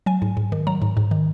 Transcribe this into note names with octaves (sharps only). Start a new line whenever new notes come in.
F#3 G#5
G#2
G#2
D#3
F#3 A#5
G#2
G#2
D#3